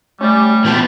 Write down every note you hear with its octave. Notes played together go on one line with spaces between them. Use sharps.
G3 A3 C#4 G4 D5
A#2 E3 B3 B4 G5 A5